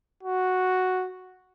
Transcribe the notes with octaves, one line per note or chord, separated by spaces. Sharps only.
F#4